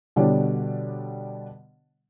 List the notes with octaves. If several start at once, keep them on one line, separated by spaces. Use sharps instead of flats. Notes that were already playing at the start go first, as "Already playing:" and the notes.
B2 D3 G3 D4 C#5